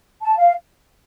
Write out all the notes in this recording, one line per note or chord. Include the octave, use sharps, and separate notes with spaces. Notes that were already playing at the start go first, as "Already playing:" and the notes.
A5
F5